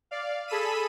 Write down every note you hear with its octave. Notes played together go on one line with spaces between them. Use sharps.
D5 F5
G#4 A4 B5 E6 B6 D#7